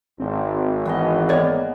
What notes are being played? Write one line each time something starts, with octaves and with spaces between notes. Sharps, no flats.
G#1 C4
E3 B3 G#4 D#5
A#3 B3 C#5 D5